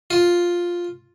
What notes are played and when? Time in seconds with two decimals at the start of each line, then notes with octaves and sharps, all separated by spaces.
0.10 F4